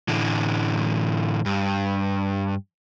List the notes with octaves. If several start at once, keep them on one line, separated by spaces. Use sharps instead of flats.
A2 D3 E3
G2